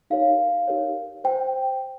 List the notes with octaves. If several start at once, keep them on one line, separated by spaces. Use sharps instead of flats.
D#4 G4 A#4 C#5 F5
D#4 G4 A#4 C#5
C5 G5